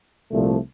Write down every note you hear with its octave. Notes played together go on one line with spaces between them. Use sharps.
C2 A#2 F3 A3